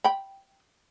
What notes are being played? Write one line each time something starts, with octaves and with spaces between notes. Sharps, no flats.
G5 B5